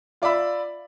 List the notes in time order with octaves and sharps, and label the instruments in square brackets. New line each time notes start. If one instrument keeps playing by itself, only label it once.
[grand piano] F4 D5 E5 B5 E6